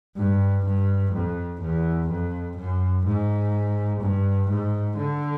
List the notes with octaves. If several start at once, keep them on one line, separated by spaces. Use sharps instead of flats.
G2
G2
F2
E2
F2
F#2
G#2
G2
G#2
D3